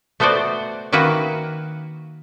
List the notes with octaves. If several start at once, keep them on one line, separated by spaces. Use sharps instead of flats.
A3 B3 F#4 C5 D5
D#3 A#3 F#4 B4 E5